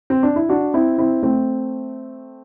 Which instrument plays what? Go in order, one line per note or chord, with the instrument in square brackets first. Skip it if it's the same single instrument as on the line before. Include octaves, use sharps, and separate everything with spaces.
[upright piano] C4
D4
E4
D4 F#4
C4 E4
C4 E4
A3 C4